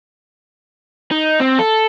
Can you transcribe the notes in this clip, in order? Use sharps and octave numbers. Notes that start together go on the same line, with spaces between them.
D#4
C4
A4